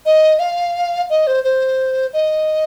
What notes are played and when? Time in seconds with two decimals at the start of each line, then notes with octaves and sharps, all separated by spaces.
0.06 D#5
0.39 F5
1.10 D#5
1.27 C5
1.44 C5
2.13 D#5